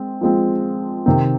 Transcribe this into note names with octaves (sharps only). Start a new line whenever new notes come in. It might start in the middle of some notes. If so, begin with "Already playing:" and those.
Already playing: G#3 C4
F3 G#3 C4
C3 D#3 C4